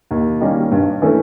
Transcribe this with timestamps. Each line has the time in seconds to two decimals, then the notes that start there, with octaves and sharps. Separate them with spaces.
0.11 D#2
0.41 D#3 G3 A#3 C#4
0.72 G2
1.02 E3 A3 C#4 E4